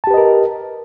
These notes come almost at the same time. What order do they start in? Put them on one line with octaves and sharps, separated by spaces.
A5 G4 B4 D#5 A#4